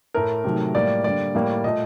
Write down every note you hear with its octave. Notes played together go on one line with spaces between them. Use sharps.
A2 A3 A#4
C3 D#3 F#3 A3
A2 G3 A#3 D5
D3 G3 A#3 D5
A2 G3 A#3
A#2 A3 D#5